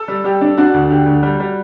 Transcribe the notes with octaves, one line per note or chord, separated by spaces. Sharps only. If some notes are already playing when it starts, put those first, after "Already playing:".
Already playing: A4
G3
G3 G4
D4
D4 F#4
F#4
D2
D3 G4
D2
G3
G3